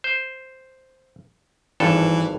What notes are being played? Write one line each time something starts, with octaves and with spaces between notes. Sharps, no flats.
C5
G#1 G2 E3 A4